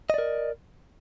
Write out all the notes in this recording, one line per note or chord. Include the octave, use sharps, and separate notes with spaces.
A#4 D5 D#5